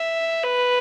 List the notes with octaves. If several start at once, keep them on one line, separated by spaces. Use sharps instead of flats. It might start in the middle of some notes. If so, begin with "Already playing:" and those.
Already playing: E5
B4